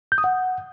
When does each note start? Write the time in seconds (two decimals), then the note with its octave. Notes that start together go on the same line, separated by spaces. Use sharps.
0.12 G6
0.18 D#6
0.24 F#5